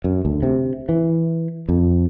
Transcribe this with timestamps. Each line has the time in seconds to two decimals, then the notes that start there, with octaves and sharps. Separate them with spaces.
0.04 F#2
0.25 D2
0.43 C3
0.89 E3
1.69 F2